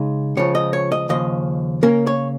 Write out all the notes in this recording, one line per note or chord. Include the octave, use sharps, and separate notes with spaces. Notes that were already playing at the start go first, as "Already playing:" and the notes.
Already playing: C#3 G#3 D#4
C#2 C#3 F3 C#5
D#5
C#5
D#5
D#2 C#3 F3 D#5
C#3 A#3 C#4 A#4
C#5